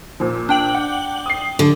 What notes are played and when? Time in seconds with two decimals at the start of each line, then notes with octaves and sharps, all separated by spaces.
0.20 A#2 F3
0.49 D4 G5 F#7
0.75 F#5
1.26 D#6 C7
1.59 D3